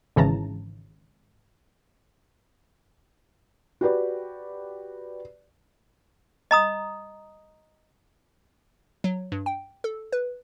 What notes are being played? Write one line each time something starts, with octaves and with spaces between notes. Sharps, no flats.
G#1 C#3 E3 A5 A#5
F#4 G4 B4 D5
D#5 A#5 D#6
F#3
G2
G5
A4
B4